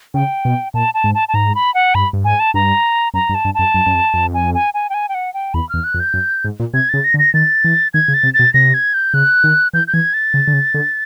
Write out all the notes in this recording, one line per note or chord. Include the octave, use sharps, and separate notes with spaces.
C#3 G5
B2
A#2 A5
A5
G#2
A5
A5
G#2 A#5
B5
F#5
G2 B5
G2
G#2 G#5
A5
G2 A#5
F#2 A#5
G2
A5
G2
F#2 A5
F#2
F#2
F2
F2
G#5
G#5
G#5
G5
G#5
G5
F#5
G5
E2 B5
E2 F6
F#6
F2
G6
F#2
G#2
A#2
C3 G#6
C#3 A6
A#6
D3
A#6
D#3 A6
E3
D#3 G#6
C#3
A6
C3
A6
B2
C3 A#6
G#6
G6
C#3 F#6
D#3
E3 G6
G6
E3 G#6
A6
C#3
D3
C#3
D3